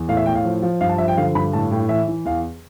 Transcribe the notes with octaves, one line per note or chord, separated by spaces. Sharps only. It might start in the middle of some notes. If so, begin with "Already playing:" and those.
Already playing: E2
A2 F5
E5
A2 G5
F5
F3
F3
G2 F5
A5
F3 E5
G5
D3 F5
G2 B5
A2 A5
A2 G5
E3 E5
E3
E2 F5